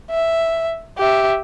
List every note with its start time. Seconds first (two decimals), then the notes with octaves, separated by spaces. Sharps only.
0.11 E5
0.98 G4 E5